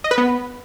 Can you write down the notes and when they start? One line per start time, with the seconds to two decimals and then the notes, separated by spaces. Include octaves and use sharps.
0.04 D#5
0.11 B4
0.18 B3